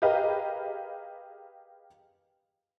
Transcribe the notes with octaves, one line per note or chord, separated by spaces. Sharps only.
G4 G#4 A#4 B4 D#5 F5